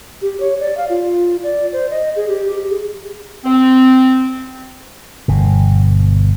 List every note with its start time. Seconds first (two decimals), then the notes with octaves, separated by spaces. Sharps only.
0.22 G4
0.40 C#5
0.60 D5
0.77 F5
0.89 F4
1.43 D5
1.73 C5
1.91 D#5
2.16 G#4
2.28 G4
2.51 G4
2.70 G#4
3.45 C4
5.28 G1 B2